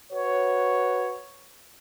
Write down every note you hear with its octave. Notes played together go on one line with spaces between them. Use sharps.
F#4 B4 C#5